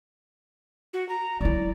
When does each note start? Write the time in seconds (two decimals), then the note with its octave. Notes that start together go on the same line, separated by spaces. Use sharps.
0.93 F#4
1.09 A#5
1.41 F#3 E4 D5